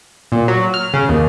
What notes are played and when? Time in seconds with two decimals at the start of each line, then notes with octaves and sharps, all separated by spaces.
0.32 A#2
0.48 F#3
0.74 F6
0.94 C#3
1.09 D#2